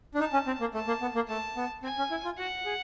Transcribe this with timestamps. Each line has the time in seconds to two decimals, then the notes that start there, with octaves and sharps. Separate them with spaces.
0.15 D4
0.20 D#4 A5
0.33 C#4
0.47 C4
0.60 A#3
0.74 A3 A5
0.87 A#3
1.02 B3
1.15 A#3
1.28 A3 A5
1.56 B3
1.83 C4 G#5
1.98 C#4
2.11 E4
2.25 F4
2.38 F#4 F#5
2.65 G#4